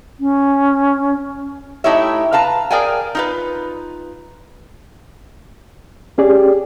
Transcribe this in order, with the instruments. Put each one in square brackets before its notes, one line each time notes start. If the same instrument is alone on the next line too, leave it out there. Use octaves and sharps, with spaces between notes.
[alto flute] C#4
[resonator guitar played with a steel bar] A3 D#4 E4 G4 C#5 E5
B4 F5 A5 A#5
G#4 A#4 D5 F5 G5 G#5
D#4 F4 B4
[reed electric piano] C#4 G#4 D5 [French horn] G4